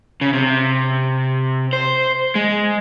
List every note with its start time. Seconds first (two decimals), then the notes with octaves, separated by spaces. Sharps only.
0.21 C#3
0.33 C3
1.73 C5
2.35 G#3